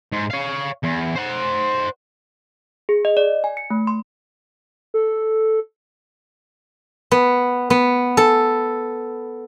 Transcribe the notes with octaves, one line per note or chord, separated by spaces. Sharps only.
G#2
C#5 F5
E2
C5 F#5
G#4
D#5
D5
G#5
C#7
A3
C6
A4
B3
B3
A4